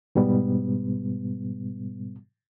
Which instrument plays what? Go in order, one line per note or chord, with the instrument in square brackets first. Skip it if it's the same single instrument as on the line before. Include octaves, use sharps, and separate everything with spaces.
[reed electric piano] G#2 B2 G3 B3